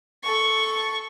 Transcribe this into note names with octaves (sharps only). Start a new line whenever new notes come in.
A4 C#6